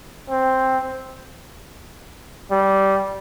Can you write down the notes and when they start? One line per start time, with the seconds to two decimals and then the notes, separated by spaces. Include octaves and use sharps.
0.29 C4
2.51 G3